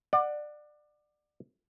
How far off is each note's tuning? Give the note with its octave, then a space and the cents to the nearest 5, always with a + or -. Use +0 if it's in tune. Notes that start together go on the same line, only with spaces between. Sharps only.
D5 +25 F#5 +0